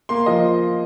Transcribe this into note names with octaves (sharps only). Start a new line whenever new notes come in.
A#3 C6
F3 D#5